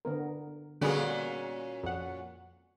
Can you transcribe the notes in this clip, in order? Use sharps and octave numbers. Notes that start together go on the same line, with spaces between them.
D3 B3 A#4
A#2 D3 G3 A#3 B3 C#4 F#4 G#4
F2 F#5